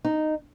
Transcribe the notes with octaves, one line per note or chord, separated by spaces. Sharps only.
D#4